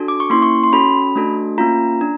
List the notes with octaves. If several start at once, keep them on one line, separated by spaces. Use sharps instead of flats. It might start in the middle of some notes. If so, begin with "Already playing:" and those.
Already playing: D4 F#4 A4
D6
C#6
A#3 C#4 E4 C6
C#6
C6
C#4 F#4 A4 B5
A3 D4 F#4 A4
A#3 C#4 F4 A#5
D4